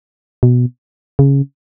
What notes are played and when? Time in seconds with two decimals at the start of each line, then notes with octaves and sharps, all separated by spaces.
0.43 B2
1.19 C#3